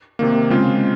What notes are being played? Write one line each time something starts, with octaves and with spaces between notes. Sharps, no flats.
C3 D#3 A#3
C#3 G#3 C4 F4